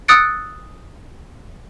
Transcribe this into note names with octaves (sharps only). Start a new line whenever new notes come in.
D#6 E6 F#6 A6 C#7 D7